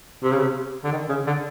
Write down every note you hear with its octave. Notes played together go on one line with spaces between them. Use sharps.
C3
C#3
C3
D3
D#3
C#3
D3